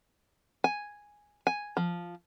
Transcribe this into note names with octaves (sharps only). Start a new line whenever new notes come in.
G#5
G#5
F3